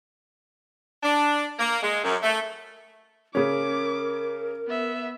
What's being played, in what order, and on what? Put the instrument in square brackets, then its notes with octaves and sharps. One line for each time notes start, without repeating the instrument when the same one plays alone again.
[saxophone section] D4
A#3
G#3
F#2
A3
[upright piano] C#3 C#4 [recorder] A#4 [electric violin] D6
[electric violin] B3 E5